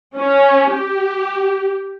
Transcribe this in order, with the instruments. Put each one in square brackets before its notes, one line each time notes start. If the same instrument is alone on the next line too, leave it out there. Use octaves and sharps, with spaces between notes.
[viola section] C#4
G4